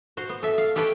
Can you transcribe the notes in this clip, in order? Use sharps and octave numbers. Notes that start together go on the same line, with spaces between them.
F#4 C5
B3
A4 E5
F5
G4 A4 B4 C#5 G5 A5